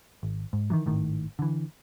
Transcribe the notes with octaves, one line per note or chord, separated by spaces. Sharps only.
G#1
G#2
D#3 E3 F#3
G#1 A2 D#3
D3 E3